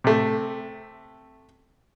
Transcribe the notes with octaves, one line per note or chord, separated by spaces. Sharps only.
C3 A3